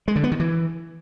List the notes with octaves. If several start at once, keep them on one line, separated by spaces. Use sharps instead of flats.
G#3
D3
B3
D#3
E3